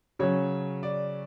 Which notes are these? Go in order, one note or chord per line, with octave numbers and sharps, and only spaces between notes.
C#3 F#3 C#4 C#5
D5